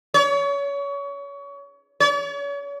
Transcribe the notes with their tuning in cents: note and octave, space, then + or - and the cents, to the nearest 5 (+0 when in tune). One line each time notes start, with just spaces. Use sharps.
C#5 +30
C#5 +40